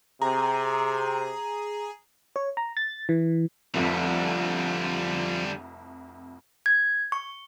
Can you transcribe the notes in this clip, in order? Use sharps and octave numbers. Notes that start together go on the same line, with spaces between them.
C3 G#4 A#5
C#5
A#5
A6
E3
F1 C2 F2 D3 F3 G3
G#6
C#6